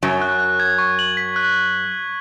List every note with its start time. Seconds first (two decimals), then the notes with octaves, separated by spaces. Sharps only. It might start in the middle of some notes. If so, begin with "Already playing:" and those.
0.03 F#2 F#3 A6
0.21 F#6
0.40 F#6
0.60 G#6
0.78 C#6
0.99 F#7
1.17 B6
1.36 F#6